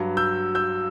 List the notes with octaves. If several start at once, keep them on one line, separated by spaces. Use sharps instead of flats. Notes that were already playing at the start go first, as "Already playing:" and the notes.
Already playing: G2 F#3
E6 G6
E6 G6